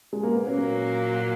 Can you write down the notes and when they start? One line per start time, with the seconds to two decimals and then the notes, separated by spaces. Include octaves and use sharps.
0.13 G#3
0.23 A#3
0.35 B3
0.46 A#2 F#3 A#3 C#4